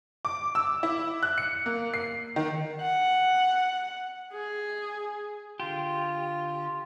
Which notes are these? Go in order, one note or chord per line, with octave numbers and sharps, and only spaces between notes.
D6
E6
E4
F#6
C#7
A#3
C7
D#3
F#5
G#4
D3 F4 G4